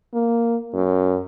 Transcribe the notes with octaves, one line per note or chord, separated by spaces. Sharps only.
A#3
F#2